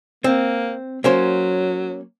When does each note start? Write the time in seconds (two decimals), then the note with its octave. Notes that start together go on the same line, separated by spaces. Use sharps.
0.24 A#3 C4
1.04 F#3 A#3 C#4 C5